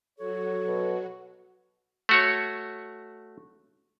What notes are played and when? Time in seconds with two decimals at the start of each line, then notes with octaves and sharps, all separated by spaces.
0.19 F#3 F#4 A4 C#5
0.68 B2
2.09 A3 F#4 C#5